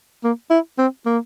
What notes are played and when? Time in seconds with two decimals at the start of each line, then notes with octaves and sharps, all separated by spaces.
0.24 A#3
0.50 E4
0.78 C4
1.06 A#3